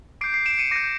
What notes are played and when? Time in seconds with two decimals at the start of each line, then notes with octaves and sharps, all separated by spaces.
0.21 D6 G6 C7 D7
0.34 C7
0.46 D7 E7
0.58 C#7 D#7
0.71 D6 G6 A#6